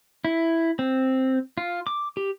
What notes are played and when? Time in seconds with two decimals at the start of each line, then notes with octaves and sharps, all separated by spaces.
0.25 E4
0.79 C4
1.58 F4
1.87 D6
2.17 G4